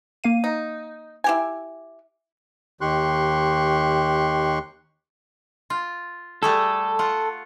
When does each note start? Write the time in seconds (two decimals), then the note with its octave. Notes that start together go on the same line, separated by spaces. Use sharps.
0.24 A#3 F5 D#7
0.44 D#4
1.24 E4 G4 G#5
2.81 D#2 D#3 G4 C6 C#6 F#6
5.70 F4
6.43 G3 A3 G#4 A4
6.99 F4 F#5